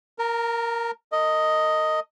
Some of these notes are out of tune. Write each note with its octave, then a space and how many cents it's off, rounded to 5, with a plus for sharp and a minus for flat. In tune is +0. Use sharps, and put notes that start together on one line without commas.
A#4 +0 A#5 -40
A#4 -45 D#5 +5